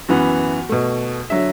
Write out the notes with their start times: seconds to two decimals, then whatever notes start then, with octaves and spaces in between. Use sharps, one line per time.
0.09 F#2 E3 B3 F#4
0.69 B2 A3
1.30 D3 F#3 E5